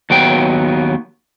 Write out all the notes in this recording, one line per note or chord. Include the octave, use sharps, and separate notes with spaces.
D#2 F#3 B3 G5